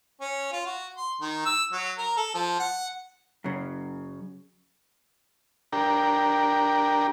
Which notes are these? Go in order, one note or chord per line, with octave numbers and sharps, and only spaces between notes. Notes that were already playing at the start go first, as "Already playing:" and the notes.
C#4
F4
F#4
C6
D#3
E6
F#3
A#4
A4
F3
F#5
F#2 C#3
D4 G4 A#4